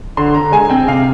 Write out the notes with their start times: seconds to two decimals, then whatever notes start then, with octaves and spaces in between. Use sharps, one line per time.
0.17 D3 C6
0.34 D3 A#5
0.52 G#3 G#5
0.70 C4 G5
0.88 C3 F5